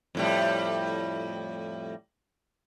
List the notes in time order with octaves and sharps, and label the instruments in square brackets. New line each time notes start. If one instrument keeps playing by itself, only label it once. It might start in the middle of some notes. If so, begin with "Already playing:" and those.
[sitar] F2 A2 G3